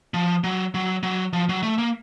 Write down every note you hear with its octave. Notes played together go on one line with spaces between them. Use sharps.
F3
F#3
F#3
F#3
F3
F#3
A3
A#3